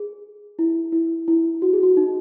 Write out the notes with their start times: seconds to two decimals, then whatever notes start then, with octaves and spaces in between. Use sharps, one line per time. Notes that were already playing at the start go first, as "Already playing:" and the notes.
Already playing: G#4
0.59 E4
0.92 E4
1.28 E4
1.62 F#4
1.73 G#4
1.83 F#4
1.97 D#4